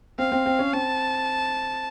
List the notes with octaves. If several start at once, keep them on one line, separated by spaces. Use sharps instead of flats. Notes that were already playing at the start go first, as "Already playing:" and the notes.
C4 F5
C4
C4
C#4
C4 A5